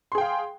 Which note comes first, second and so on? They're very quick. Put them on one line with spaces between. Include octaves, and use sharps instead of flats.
C6 G#4 G5 F5